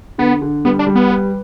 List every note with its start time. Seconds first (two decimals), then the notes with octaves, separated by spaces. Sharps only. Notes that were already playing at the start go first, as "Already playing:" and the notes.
0.18 D3 B3
0.42 D3
0.65 G3 B3
0.79 D4
0.87 G3
0.95 B3
1.10 B4